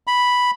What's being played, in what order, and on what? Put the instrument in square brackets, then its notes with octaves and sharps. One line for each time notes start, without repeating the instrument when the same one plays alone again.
[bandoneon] B5